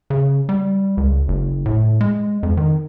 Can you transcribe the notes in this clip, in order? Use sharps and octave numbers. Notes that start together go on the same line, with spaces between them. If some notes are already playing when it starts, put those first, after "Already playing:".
C#3
G3
C#2
F#1
A2
G#3
F2
D#3